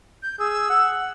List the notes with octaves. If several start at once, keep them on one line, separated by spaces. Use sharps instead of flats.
G6
G#4 E6
F#5